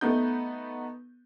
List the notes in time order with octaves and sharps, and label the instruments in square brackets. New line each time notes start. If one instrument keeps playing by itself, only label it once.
[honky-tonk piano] A3 B3 D#4 G6